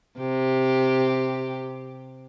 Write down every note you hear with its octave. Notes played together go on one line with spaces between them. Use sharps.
C3 G4